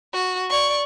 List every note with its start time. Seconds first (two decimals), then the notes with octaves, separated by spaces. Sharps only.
0.13 F#4
0.49 D5 C#6